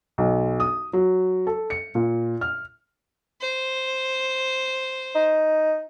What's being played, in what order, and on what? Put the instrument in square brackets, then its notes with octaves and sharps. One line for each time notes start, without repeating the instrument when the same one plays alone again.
[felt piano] B1
D#6
F#3
A4
C#7
A#2
F6
[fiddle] C5
[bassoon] D#4